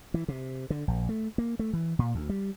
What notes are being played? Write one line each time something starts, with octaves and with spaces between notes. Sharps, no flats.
E3
C3
D3
A#1
A3
A#3
A3
E3
A#2
D2
G3